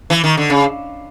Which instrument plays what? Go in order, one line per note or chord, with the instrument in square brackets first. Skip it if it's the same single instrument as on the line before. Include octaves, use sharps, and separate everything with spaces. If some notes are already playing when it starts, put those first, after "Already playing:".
[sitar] E3
D#3
D3
C#3